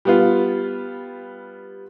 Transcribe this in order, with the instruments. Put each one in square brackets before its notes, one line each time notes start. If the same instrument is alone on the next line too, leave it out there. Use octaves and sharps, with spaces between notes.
[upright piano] G3 B3 F4